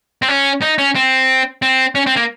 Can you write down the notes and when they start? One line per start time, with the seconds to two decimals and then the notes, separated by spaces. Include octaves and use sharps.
0.22 C4
0.28 C#4
0.62 D#4
0.78 C#4
0.95 C4
1.62 C4
1.95 C#4
2.06 C4
2.16 A#3